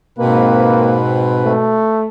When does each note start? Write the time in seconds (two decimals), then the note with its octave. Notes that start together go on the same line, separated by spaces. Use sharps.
0.19 G#2 B2 A#3 C4 B4
1.45 A3